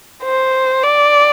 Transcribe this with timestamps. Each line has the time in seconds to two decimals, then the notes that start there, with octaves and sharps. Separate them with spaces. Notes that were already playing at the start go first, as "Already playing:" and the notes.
0.23 C5
0.83 D5